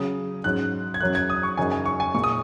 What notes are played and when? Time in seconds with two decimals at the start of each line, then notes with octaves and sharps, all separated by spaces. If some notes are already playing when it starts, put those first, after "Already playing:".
Already playing: C#3 F#3 C#4 D#6
0.44 G#2 F#3 C#4 F#6
0.94 G#6
1.00 F#2 F#3 C#4 F#6
1.15 G#6
1.30 D#6
1.43 C#6
1.57 F#2 C#3 F#3 D#4 G#5
1.72 G#5
1.86 C#6
2.00 G#5
2.15 A#2 G#3 D#4 C#6
2.24 D#6